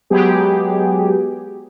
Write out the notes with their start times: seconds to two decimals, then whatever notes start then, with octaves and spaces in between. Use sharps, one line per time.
0.10 F#3 G#3 B3 G4 G#4